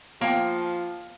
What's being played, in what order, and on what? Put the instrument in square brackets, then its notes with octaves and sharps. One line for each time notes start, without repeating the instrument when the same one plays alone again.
[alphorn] F3 [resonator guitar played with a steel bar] A#3 G5